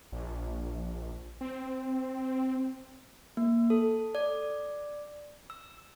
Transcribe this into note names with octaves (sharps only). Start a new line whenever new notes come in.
A#1
C4
A#3
A4
D5
E6